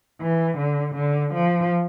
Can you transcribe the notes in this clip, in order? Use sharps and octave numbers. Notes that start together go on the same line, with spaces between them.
E3
D3
D3
F3